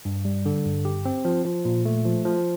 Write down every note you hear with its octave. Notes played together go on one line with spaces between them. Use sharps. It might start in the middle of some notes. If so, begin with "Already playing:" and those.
G2
G3
D3
G2
G4
C4
F3
F3
A#2
A3
F3
F3